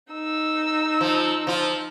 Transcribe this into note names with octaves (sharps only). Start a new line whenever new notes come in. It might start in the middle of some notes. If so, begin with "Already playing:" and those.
D#4 E6
F3
F3 F4